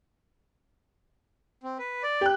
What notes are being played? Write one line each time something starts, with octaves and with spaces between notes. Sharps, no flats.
C4
B4
D5
G4 F#6